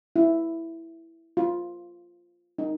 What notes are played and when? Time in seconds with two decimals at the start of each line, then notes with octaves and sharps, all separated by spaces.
0.16 E4
1.37 F4
2.58 D#4